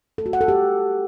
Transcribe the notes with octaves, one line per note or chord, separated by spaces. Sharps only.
A4
F#4
F#5
A4
G4